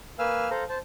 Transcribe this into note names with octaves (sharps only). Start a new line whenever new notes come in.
A#3 B4 F5 G#5 E6 F6
A4 C5 F5 A#5
C5 A5